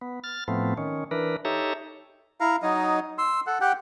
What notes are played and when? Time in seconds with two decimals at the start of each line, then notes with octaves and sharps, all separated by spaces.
0.01 B3
0.24 F6 A6
0.48 A2 F3 A3 B3 C4
0.77 D#3 C#4
1.11 E3 D4 A#4 B4
1.45 D#4 G4 A4 C#5 E5 A#5
2.40 E4 F5 A#5
2.62 F#3 D#4 D#5
3.18 C6 E6
3.47 A4 F#5
3.61 G4 F#5 G5